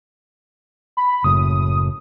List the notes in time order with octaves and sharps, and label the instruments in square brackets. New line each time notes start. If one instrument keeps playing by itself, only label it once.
[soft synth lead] B5
[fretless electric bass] F#1 F#2 A2 [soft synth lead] D#6